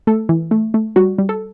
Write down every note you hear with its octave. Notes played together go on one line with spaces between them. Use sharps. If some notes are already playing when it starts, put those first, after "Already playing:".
A3 A4
E3
A3
A3
G3 F#4
G3
A4